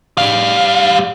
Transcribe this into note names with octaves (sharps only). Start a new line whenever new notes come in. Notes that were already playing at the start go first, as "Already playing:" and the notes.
G3 F5